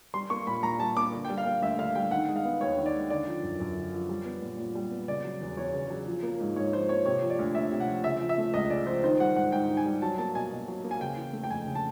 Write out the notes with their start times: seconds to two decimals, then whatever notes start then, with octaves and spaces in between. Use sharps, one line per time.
0.14 G3 C6
0.30 A#3 C#6
0.47 A#2 B5
0.63 A#2 A#5
0.79 G3 A5
0.97 A#3 D6
1.13 D3
1.25 G5
1.30 G3
1.38 F5
1.46 A#3
1.62 D2 E5
1.78 D3 F5
1.95 G3 G5
2.11 D#3 F#5
2.28 G#3
2.36 F5
2.45 B3
2.61 D#2 C#5
2.77 D#3
2.86 D5
2.93 G#3
3.10 D3 D5
3.27 F3
3.43 F#2
3.60 F#2
3.76 D3
3.92 F3
4.09 G3
4.25 B3
4.42 A#2
4.59 A#2
4.75 G3
4.91 B3
5.08 C#3 D5
5.24 F#3
5.41 E2
5.57 E2 C#5
5.74 C#3
5.90 F#3
6.06 F3
6.23 A#3
6.40 G#2
6.56 G#2 C#5
6.73 F3 C5
6.89 A#3 C#5
7.06 C3 C#5
7.22 F3
7.30 D5
7.39 D2
7.55 D2 E5
7.72 C3
7.80 F#5
7.88 F3
8.04 C#3 E5
8.20 F3
8.29 E5
8.38 A3
8.54 C#2 D#5
8.70 C#3 D5
8.87 F3 C5
9.03 D#3 C5
9.20 G3 F#5
9.36 G#2 F#5
9.52 G#2 G5
9.69 D#3
9.77 G#5
9.86 G3
10.02 F#3 A5
10.18 A#3 A5
10.35 B2 G#5
10.52 B2
10.68 F#3
10.84 A#3
10.91 G#5
11.01 C#3 G5
11.17 E3
11.33 A3
11.43 G5
11.50 F2 G#5
11.67 C#3
11.75 A5